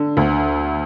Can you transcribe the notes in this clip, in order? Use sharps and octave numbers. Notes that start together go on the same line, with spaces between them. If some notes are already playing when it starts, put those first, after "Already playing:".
Already playing: D3
D2